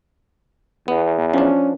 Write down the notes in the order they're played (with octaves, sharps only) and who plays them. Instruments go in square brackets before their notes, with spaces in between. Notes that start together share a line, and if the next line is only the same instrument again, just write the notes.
[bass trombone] E2 [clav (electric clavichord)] B3
[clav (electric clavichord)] F3 D4 [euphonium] C#4